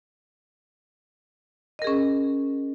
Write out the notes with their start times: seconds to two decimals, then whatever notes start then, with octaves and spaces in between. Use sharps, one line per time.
1.79 D#5
1.82 A#4
1.84 G#4
1.87 C#4